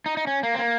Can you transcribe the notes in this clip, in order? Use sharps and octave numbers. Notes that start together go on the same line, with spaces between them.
D#4
D#4
C#4
A#3
C4
A#3